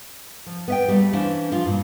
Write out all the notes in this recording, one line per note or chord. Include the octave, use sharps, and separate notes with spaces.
F3
B3 E5 G5
G3 A3 A#3
E3 C#4 D4 E4 C5 F5
F3 D4 F4
G2 A#2